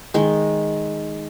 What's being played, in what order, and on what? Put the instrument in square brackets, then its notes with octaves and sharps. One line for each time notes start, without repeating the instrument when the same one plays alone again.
[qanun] D#3 G#3